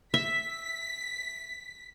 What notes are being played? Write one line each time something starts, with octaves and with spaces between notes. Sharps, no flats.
E5 B6